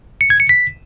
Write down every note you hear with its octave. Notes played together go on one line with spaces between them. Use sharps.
C#7
G#6
C#7
B6